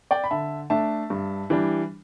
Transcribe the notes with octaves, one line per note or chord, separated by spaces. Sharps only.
D5 G5
B5
D3 E5 A5
A3 D4 E5 A5
G2
E3 G3 D4